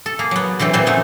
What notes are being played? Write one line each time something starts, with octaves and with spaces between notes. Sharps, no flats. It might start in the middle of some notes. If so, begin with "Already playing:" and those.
A4
A#3 G#4
F#3 B3
D3 E3 F#3 C4
A#2 E3 C4 C5
F#2 F#3 A3 D#4